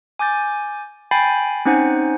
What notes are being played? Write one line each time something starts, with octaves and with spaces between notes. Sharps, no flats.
G#5 D6 G6 A6
G5 G#5 B5 G6 A6 C7
C4 C#4 D#4 C5 F#5 G#5